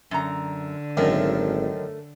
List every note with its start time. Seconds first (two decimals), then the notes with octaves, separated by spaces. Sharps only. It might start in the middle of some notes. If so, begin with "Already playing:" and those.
0.11 F#2 D3 A#5
0.97 G#1 F#2 D#3 A3 C#4 A#4